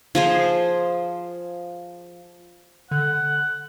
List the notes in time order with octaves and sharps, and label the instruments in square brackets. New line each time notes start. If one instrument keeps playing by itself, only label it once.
[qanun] F3 G#4 C5
[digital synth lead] D3 [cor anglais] F#5